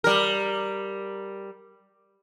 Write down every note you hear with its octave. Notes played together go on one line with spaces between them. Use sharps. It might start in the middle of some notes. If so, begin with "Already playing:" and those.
G3 A#4